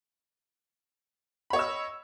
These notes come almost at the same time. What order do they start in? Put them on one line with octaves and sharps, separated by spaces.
B5 C#5 D#5 E6